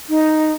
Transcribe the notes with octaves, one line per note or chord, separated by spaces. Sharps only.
D#4